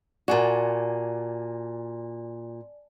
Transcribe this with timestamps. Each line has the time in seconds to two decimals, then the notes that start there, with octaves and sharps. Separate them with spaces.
0.28 A#2 F#4 D5 G#5 A5